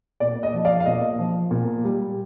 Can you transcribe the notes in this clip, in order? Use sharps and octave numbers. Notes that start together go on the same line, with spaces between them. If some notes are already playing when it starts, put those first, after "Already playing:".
A#2 D5
D#5
F3
D5 F5
F5
A#2 D#5
F3
A#2
G3